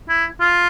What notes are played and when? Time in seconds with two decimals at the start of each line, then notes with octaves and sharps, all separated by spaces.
0.09 E4
0.40 F4